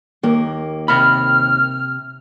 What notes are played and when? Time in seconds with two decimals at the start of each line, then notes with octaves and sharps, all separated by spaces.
0.23 D#2 A#3
0.88 C3 B5 F6